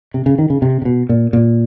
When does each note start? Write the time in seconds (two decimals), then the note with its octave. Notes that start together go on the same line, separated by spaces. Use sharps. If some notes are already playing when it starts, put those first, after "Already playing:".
0.14 C3
0.26 C#3
0.39 D#3
0.50 C#3
0.62 C3
0.82 C3
0.85 B2
1.09 A#2
1.33 A#2